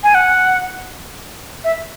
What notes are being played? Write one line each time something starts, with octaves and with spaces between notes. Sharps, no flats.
G#5
F#5
E5